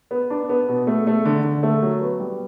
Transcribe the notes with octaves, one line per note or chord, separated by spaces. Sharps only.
B3
D4
B3
B2
A3
A3
D3
D3
A3
F#3
B3
G3